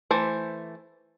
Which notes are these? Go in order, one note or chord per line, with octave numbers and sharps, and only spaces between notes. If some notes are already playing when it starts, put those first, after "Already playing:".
E3 A3 C5